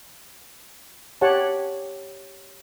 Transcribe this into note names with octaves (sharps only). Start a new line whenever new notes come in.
G4 C#5 F#5 G5 A5